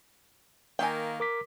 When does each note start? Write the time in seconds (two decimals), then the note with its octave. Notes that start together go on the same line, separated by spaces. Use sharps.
0.79 D#3 A#3 G5 G#5
1.20 A#4 D6 B6